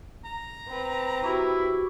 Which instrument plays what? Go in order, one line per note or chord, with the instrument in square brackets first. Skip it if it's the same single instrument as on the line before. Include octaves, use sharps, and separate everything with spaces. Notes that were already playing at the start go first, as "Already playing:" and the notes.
[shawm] A#5
[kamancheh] C4 B4
[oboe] E4 [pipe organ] F#4 G4